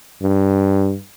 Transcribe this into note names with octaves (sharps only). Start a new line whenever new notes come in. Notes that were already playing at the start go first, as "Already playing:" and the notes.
G2